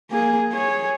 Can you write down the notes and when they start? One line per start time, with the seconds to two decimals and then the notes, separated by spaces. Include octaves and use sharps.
0.11 A#3 G#4
0.52 G#4 C#5